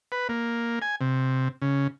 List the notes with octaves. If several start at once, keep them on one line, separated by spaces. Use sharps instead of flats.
B4
A#3
G#5
C3
C#3